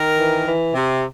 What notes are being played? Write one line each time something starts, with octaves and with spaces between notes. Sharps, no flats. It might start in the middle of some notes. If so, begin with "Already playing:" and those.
Already playing: D#3 A#4
E3
E3
C3